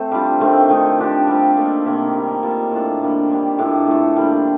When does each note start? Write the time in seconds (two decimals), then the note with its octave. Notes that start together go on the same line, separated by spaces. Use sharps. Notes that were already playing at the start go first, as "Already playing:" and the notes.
Already playing: A3 C4 C5
0.11 G3 D4 F4
0.40 D#3 A3 C4
0.69 D#3 A3 D#4
0.98 F3 A3 D4 G4
1.27 G3 C4 F4
1.57 A#3 D#4 A4
1.86 C3 D#3 A#3
2.14 G3 A#3 D#4
2.43 G3 A#3 F4 A4
2.71 A2 A3 D4 A4
3.01 D3 G3 A#3
3.29 D#3 G3 D4
3.58 A2 A3 D4 F4
3.87 A2 F3 A3
4.16 D3 G3 A#3 F4